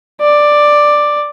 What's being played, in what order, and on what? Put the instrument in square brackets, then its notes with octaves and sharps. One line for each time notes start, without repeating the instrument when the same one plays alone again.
[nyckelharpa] D5